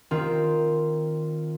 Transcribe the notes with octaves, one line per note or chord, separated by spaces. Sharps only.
D#3 C4 F4